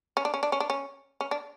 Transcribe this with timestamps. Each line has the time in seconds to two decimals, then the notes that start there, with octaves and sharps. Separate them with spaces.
0.17 C#4
0.25 D4
0.34 C#4
0.43 D4
0.52 C#4
0.60 D4
0.70 C#4
1.21 C#4
1.31 D4